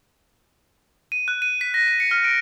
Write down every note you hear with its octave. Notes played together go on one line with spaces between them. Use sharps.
D#7
F#6
D#7
B6
A#6
B6
C#7
F6
D7